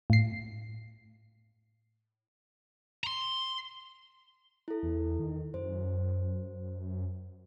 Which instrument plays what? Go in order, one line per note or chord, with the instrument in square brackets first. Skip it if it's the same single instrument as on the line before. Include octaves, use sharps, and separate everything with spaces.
[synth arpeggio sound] A2 C7
[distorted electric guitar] A#5 C6
[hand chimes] E4 A4
[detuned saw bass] E2
D#3
[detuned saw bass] F#2 [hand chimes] C5